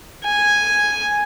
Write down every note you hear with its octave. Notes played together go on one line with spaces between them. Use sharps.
G#5